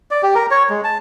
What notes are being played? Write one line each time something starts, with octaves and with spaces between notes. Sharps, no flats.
D5
G4
A#4
C#5
G#3
A5